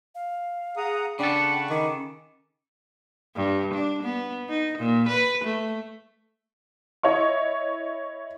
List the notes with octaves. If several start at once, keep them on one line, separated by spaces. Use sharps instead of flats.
F5
G#4 F#5 A#5 D#6
C#3 D4 A4 F#5 G5 B5 C#6
D#3 D6
G2
D4
B3
D#4
A#2
B4
A3
E4 C#5 D#5 C#6